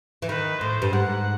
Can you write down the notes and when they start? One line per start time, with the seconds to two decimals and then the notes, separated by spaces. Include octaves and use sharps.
0.22 E3
0.29 D#3 B4
0.61 A2 C5
0.82 G2
0.93 G#2 F#5